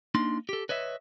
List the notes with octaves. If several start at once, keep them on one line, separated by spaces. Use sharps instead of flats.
A#3 D4 D#4 C6
G4 A4
B4 C#5 D#5 E5